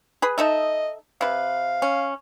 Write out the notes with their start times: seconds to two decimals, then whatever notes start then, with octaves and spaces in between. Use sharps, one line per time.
0.22 G#4 B4
0.38 D#4 A4 D#5 E5
1.21 C3 B4 F5
1.82 C#4